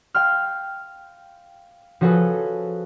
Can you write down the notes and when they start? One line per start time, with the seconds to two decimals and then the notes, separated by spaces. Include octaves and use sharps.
0.14 F5 G5 C6 F6
2.01 F3 C#4 F#4 G#4 A4 B4